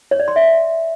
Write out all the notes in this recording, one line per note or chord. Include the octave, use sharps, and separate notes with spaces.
C#5
D5
C6
E5